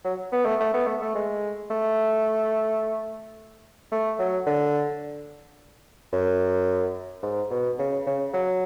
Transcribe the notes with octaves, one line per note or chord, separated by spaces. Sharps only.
F#3
B3
A3
A3
B3
A3
A3
G#3
A3
A3
F#3
D3
F#2
G#2
B2
C#3
C#3
F#3